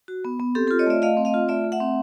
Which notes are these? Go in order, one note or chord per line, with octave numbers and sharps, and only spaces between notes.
F#4
B3
B3
C4 G4 A4
F4 G4 A4
C#5 D#5
A3 D5 E5
A3 D#5 F5
C4
D#5 F5
F4
A3 D5 E5
A3
E5 F#5
C4